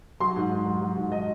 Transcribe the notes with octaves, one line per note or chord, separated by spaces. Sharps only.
F#3 C6
G#2
G#2
F#3
F#3
G#2
F#3 D#5